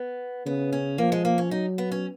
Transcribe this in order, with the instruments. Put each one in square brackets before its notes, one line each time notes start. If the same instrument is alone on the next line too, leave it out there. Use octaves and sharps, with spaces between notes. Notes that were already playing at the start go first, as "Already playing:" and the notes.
Already playing: [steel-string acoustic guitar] B3
[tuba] C#3 [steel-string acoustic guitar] B3
[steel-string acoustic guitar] C#4
[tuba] F3 [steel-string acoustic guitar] A#3
[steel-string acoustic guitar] G#3
A#3
C#4
[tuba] F#3 [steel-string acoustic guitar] D#4
[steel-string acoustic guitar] B3
C#4